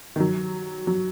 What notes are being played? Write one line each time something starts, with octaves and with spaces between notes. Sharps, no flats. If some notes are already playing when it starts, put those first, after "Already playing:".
D#3
F#3
F#3